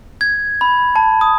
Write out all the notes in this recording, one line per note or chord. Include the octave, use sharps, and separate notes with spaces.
G#6
B5
A5
D#6